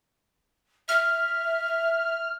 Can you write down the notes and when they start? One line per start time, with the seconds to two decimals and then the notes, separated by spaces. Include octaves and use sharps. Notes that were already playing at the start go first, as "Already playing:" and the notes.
0.89 E5 F6